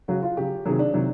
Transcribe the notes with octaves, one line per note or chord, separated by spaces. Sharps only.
C#3 F#3 F#4
F4
C#3 F#3 G4
C3 D#3 F#3 G#4
D4
C3 D#3 F#3